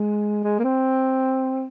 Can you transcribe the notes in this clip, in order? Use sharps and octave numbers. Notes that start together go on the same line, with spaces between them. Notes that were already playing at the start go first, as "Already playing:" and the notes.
Already playing: G#3
G#3
A#3
C4